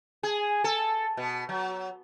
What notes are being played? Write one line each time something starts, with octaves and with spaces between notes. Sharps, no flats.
G#4
A4
B2
F#3